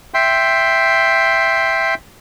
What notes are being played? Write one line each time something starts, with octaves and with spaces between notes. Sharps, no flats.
E5 G5 C6